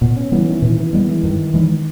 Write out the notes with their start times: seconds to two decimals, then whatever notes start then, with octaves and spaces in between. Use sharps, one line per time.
0.01 A#2 B3
0.16 C#4
0.32 E3 G3 B3
0.48 D#3
0.62 A#2 E3
0.77 E3
0.93 G3 G#3 B3
1.09 E3
1.23 G2 D#3
1.54 D#3 E3 G#3